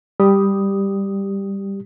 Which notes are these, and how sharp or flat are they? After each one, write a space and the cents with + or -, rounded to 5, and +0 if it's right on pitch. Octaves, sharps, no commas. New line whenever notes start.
G3 +10 G4 +0 D#6 +5